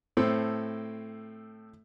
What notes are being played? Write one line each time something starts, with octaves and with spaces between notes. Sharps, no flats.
A2 C4 A4